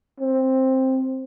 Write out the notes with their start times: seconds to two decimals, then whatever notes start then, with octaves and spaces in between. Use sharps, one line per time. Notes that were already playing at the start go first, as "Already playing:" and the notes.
0.20 C4